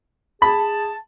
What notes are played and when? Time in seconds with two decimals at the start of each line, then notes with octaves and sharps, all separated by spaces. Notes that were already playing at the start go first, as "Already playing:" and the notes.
0.42 G#4 A5 B5